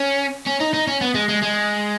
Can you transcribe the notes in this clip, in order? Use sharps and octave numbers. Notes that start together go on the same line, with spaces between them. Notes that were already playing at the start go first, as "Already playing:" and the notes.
Already playing: C#4
C#4
D#4
D#4
C#4
B3
G#3
G#3
G#3